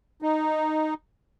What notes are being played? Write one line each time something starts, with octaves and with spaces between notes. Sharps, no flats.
D#4